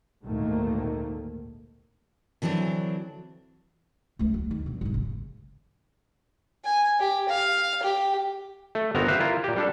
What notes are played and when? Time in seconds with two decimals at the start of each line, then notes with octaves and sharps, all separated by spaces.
0.25 G#1 D2 A#2 D#3 A3 A#3
2.42 D3 E3 F#3 C4 D4
4.19 C#2 A3
4.33 D2 F3
4.51 D#3
4.66 G2 B2
4.81 G#1 C3
4.94 C#3
6.65 G#5
7.00 G4
7.29 F5
7.83 G4
8.75 A3
8.95 G1 B3 C4 F#4 A#4 A#5
9.08 F#4 G4 B4 C5 E5 F5
9.20 E4 F4 A#4
9.44 A#2 G4
9.56 G3 D4 A4